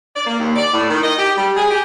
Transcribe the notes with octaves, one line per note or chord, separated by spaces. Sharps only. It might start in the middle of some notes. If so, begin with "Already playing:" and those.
D5
A#3
D#2
D5
A2
D#3
D#5
G4
G3
G#4
G4